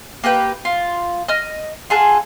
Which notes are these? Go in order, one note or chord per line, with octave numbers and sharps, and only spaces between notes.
A#3 G4 B4 G5
F4
D#5 F6
F4 G#4 A4 F#5